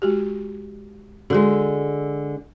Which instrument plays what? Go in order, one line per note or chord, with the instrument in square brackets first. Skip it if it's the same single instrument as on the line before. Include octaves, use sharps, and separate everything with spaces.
[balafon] G#3 F#4 G4
[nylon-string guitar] D3 G#3 [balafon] F#4 A4